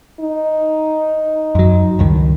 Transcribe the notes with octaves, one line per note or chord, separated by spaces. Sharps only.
D#4
F#2 F#3
C#2 G2 D#3